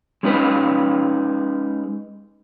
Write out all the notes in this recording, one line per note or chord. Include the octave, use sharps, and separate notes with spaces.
G#3 C#4 D#4 A4 B4